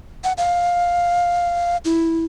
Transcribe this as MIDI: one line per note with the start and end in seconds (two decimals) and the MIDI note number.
0.24 0.32 78
0.38 1.77 77
1.85 2.25 64